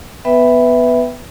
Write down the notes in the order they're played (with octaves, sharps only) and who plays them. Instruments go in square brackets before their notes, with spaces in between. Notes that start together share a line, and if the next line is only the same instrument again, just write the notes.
[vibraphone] B3 B4 E5 G5 B5